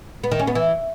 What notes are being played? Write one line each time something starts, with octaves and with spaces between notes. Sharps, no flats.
B3
D#3
C#4
B3
E3